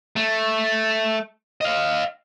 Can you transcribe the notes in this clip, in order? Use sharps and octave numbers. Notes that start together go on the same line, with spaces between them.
A3
D#5 F5